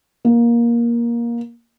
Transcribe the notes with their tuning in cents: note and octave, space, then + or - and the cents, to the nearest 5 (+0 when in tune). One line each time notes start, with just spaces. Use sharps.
A#3 +15